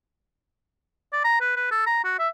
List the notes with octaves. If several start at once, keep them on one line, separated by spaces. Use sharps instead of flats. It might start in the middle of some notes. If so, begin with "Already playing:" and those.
D5
A#5
B4
B4
A4
A#5
F#4
E5